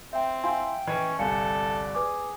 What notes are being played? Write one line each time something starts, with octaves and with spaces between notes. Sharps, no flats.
C4 E5 G5
E4 F5 G5 G#5 C6
E3 C#4 D#5 G#6
G1 C2 A4 D5 F5 G#5 C#7
G#4 B4 D6